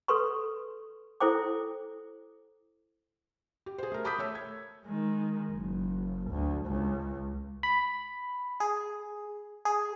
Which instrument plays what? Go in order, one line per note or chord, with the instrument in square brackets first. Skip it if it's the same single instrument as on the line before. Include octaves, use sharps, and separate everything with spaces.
[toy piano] A4 B4 C6 C#6
E4 A4 C5 G5 D6
[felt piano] G4
G#4 C5
A3 A#4
A5 B5 D6 D#6 G6 B6
A3 C#5 E6
G#6
[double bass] D#3 G#3
F#1
D2
C#2
[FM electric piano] B5
G#4
G#4